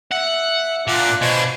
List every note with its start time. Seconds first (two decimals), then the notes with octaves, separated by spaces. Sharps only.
0.12 E5 F#5
0.87 A#2 D4 F4 D5 F#5
1.21 B2 D4 C5 G#5